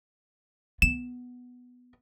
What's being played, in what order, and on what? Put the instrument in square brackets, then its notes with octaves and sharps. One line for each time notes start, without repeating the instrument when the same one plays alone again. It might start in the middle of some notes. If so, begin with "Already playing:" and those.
[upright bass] B3 [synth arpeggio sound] E7